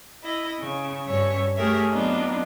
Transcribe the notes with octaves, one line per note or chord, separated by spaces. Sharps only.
E4 D#5
C#3 C#6
G2 C#4 C#5 E5 C#6
A3 G4 G#4 A#4 C#5 E5
F#3 B3 C4 D4 D#4 F4